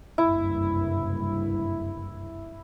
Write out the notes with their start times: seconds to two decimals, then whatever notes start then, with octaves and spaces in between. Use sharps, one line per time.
0.18 F#1 C2 G2 E4